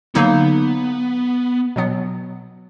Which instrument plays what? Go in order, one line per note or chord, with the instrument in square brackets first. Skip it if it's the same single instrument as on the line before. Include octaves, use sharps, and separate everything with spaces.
[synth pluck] D3 F#3 A#3 D#4 [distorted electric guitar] B3
[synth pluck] B2 F#3 B3